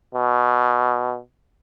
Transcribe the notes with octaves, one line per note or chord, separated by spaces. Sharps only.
B2